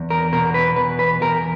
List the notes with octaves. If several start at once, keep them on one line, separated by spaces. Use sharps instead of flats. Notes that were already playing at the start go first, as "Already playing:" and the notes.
Already playing: E2
A#4
B2 A#4
B4
E2 B4
B4
E2 A#4